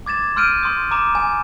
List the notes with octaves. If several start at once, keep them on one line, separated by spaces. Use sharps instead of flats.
D6 G#6 A6 E7
C6 E6 F6 G6 D7 D#7
C6 D#6 G6
A#5 D6 E7
G#5